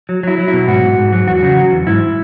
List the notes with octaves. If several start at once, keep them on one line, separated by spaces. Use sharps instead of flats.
F#3
F#3 E4
F#3
B2 E4
G#2 F#4
G#2
G#2
F#3
E2 F#4
C#3
F#3
E2
G#2 E4